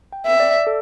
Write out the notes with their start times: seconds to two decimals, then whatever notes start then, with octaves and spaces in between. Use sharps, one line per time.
0.13 G5
0.26 E5
0.40 D5
0.67 A4